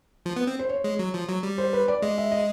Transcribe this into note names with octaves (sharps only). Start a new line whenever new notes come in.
F3
B3
C4
C5
C#5
G#3
F#3
F3
F#3
G3
C5
B4
D5
G#3 D#5
E5
D#5